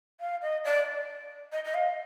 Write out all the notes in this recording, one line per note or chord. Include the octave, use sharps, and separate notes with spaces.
F5
D#5
D5
D#5
D#5
F5